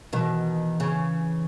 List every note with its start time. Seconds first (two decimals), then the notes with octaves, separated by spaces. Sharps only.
0.13 B2 D#3 E3
0.80 C#3